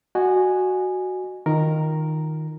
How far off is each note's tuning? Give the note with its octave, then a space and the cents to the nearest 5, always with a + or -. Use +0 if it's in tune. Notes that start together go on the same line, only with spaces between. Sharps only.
F#4 +0 D#5 -35 G#5 +0
D#3 +0 F4 +0 A#4 +0